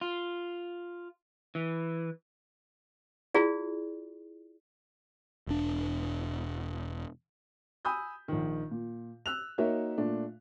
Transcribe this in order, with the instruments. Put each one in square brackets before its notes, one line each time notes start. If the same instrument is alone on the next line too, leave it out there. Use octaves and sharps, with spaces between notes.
[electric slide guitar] F4
E3
[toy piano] E4 F4 G#4 D5
[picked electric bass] E1 D4
[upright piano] G#5 B5 D#6 E6 G6
A#1 D#3
A#2
E6 F#6 F7
A#3 D#4 F#4 A#4 C#5 E5
A#2 A3 D4